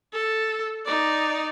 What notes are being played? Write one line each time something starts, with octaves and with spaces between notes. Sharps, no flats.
A4
D#4 D5